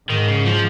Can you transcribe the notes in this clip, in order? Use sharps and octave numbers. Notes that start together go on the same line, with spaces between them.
G#2 D#3
C#3
F3